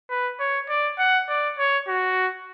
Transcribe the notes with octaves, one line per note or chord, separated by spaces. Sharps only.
B4
C#5
D5
F#5
D5
C#5
F#4